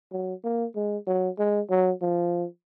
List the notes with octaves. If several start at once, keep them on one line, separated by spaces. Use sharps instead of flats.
F#3
A#3
G#3
F#3
G#3
F#3
F3